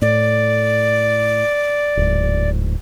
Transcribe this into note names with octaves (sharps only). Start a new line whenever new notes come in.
A2 D5
D1 G#2